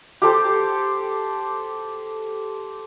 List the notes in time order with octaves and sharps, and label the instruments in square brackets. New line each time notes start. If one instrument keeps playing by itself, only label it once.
[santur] G4 A4 C5